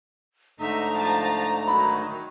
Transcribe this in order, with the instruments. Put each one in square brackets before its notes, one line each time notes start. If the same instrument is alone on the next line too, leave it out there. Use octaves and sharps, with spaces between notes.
[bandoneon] G#2 D3 A3 [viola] D#4 E5 [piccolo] A#5
[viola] F3 A5
[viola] D#3 F#3 [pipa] B5